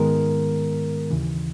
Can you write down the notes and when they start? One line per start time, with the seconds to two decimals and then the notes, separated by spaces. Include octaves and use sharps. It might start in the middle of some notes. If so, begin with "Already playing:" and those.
Already playing: G#2 D#3 G#3 B3 A#4
1.11 D#2 C#3 E3